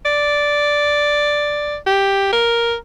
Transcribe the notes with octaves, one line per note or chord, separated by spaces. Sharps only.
D5
G4
A#4